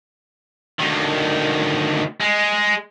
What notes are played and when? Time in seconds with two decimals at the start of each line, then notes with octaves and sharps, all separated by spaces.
0.80 D2 D#3
2.21 G#3